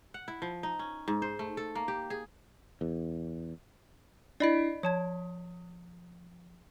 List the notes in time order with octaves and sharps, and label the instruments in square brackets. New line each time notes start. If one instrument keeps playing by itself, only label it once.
[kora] F#5
E4
F3
D#4
C#4
G#2
C5
A3
A4
A#3
G4
G#4
[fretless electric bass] E2
[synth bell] D4 E4 [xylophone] D5 D#5 B5
[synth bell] F3 [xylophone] C#5 A5 G#6